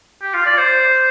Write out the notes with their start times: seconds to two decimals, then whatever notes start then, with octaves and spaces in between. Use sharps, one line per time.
0.22 G4
0.34 F4
0.46 D5
0.58 C5